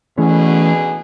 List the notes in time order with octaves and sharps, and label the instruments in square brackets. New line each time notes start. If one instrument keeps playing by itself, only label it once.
[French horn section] B2 D3 G#4 [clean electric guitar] E3 A3 C#4